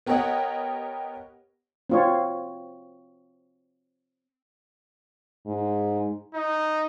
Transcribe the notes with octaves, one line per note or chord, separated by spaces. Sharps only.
B3 G4 A#4 C#5 D#5 F#5
C4 F4 C#5
G#2
D#4